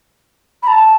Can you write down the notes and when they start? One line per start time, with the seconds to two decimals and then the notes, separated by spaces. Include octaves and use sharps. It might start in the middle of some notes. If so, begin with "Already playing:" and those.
0.63 B5
0.68 A5